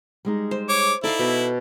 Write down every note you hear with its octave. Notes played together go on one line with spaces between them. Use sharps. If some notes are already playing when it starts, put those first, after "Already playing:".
G3 G#3 D#4
C5
C#5 D6
D#4 E4 A4 D5 F5
B2 G5